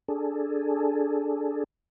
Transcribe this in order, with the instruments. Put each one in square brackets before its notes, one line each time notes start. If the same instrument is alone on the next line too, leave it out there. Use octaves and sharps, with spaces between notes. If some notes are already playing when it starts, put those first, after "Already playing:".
[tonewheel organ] D4 G#4 A4